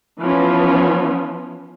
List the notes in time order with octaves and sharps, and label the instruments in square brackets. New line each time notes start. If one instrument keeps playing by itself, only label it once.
[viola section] E3 F3 B3 C#4